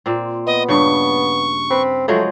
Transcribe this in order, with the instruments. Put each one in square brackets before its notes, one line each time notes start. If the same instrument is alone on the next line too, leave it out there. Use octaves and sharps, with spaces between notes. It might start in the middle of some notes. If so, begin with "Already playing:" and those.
[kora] A#2 C4
[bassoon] B3 [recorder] D#5
[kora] G2 C#3 [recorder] C#6
[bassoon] C4 [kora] B4
[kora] F3 F#3 G#3 [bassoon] A3